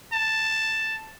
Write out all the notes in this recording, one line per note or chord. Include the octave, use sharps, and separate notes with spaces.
A5